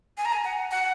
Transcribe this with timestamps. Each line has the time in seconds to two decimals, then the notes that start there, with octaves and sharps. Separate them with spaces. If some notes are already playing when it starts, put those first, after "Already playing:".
0.17 G#5
0.25 A#5
0.32 G#5
0.45 F#5
0.71 F#5